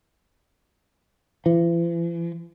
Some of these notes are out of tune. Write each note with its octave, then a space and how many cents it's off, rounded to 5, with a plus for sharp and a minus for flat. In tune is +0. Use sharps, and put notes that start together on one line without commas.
E3 +45